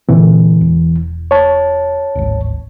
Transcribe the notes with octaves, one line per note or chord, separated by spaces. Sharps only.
A#2 D3 E3 C4
E1
C#5 A5
D1 G#1